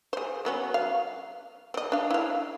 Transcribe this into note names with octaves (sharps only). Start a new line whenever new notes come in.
G#4 C5
F#3 B3 C#4
F5
C4 D#5
D4 F5
E4 F5